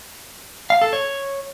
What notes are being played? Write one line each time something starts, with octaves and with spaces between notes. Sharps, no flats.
F5
A4
C#5